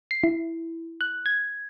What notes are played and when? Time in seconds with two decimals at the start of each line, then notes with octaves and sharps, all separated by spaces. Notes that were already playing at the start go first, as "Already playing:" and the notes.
0.11 C7
0.24 E4
1.01 F#6
1.26 G#6